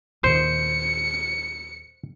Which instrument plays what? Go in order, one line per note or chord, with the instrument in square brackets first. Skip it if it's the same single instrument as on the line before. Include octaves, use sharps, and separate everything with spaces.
[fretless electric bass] D#2 A#2 D#3 [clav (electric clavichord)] C5 [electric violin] C#7